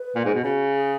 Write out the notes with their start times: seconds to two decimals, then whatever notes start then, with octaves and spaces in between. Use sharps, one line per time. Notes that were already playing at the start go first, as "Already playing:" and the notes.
Already playing: B4
0.16 A#2
0.25 G#2
0.35 B2
0.44 C#3 F#4
0.73 G#4